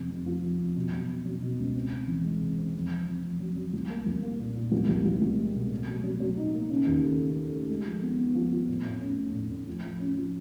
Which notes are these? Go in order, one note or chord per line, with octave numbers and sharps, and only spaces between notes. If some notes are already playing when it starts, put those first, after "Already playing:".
Already playing: F2 C3
F2
F3
F2
F2
B2
F#3
B2
F#3
B2
C#2
C4
C4
E3
G#3
C3
C4
F2
F2
F2
F2
F#3
F#3
C2
A#3
C2
A#3
A#2
A#2
C2
C2
C2
C2
G#3
B2
A2
F#3
F#3
F#3
D#4
A#3
C#3
D#2
A3
C#3
A3
A3
G#3
F3
B3
B3
F3
F3
A2
A2
C#4
A2
A2
A2
F3
F3
C#4
F3